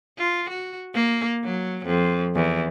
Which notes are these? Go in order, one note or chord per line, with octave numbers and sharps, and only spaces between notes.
F4
F#4
A#3
F#3
F2
E2